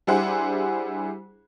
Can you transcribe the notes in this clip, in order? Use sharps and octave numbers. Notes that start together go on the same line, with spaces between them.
G3 D4 E4 G#4 C5 F#5